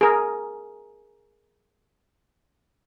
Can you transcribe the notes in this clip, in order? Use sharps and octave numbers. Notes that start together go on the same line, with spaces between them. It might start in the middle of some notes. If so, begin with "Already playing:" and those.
G#4 A#4